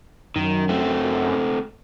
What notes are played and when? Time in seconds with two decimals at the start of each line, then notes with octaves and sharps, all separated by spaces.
0.36 F#2 D#3
0.69 A3 C4